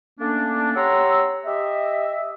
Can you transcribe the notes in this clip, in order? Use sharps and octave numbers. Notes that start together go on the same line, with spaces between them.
A3 A#3 C#4 D4
G4 C#5 F#5 A#5 C6 E6
G4 D#5 E5